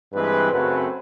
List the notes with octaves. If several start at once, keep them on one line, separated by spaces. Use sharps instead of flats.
G2 E3 G#3 C4 B4
F#2 C#3 F#3 A3 C4 B4